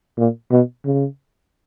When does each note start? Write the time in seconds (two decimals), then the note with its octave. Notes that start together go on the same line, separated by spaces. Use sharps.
0.18 A#2
0.51 B2
0.85 C#3